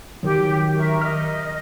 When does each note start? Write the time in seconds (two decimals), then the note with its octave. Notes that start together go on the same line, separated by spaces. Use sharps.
0.23 D#3 F#3 G4
0.75 A#4 E5 C#6
1.02 D#5 F6